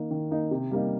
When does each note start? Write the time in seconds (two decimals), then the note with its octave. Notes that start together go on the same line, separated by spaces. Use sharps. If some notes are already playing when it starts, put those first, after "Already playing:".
Already playing: D#3 A#3 D#4
0.11 D#3
0.31 A#3 D#4
0.51 C3
0.71 G3 A#3 D#4